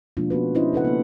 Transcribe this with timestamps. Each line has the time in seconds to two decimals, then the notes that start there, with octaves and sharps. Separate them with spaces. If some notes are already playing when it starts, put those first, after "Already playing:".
0.17 B2 F3 G#3 A#3 D4 F4
0.30 B3 C#4 F#4 B4
0.55 C#4 D4 E4 C5 D#5
0.73 C#3 A4 B4 F#5
0.85 A#3 B3